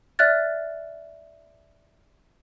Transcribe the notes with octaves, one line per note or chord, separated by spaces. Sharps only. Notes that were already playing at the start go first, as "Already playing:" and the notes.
D5 E5 F6 F#6 A6